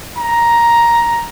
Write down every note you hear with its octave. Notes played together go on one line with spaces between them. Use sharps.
A#5